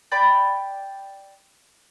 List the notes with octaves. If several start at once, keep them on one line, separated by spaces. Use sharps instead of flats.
D5 G5 B5